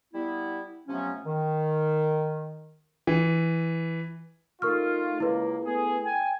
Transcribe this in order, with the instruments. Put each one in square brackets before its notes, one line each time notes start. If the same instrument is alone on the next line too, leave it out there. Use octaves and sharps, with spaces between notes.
[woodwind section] G3 B3 E4
C3 F3 F#3 A3 B3 C#4
D#3
[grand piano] E3
[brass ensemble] A3 D#4 F4 [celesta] A#4 C#6 F6
[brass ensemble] C#2 A#3 [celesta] E4 B4
[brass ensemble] A3 B3 G#4
G5 G#5